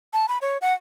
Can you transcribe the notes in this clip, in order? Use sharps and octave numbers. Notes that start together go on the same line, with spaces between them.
A5
B5
C#5
F#5